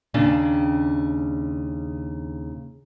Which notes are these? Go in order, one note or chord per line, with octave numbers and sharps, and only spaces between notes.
D#2 C#3 D4